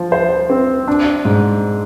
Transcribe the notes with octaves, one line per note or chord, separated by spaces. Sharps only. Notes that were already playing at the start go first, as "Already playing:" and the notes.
Already playing: F3
C5
C4
D4
G#2